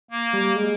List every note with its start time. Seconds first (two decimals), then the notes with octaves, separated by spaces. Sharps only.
0.11 A#3
0.33 G3
0.56 G#3